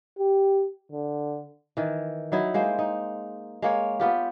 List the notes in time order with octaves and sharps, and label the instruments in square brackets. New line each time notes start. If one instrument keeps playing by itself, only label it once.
[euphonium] G4
D3
[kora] D#3 E3
F#3 D#4 E4
G#3 A#3 C5
D#4
G#3 A#3 C#5
B3 F4 G4